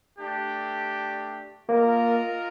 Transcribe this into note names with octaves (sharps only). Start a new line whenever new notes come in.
A3 D4 G4
A#3 F4 A#4 D#5